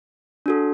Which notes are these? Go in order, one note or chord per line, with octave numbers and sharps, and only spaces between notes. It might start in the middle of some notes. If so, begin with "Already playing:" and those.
D4 F#4 A4